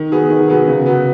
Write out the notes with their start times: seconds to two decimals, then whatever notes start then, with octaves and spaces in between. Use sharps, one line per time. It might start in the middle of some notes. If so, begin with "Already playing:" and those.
Already playing: D#3
0.12 F#3 B3 G#4
0.30 D#3
0.48 F#3 B3 G#4
0.67 C#3
0.86 F#3 B3